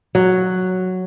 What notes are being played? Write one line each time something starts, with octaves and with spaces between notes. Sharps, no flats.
F#3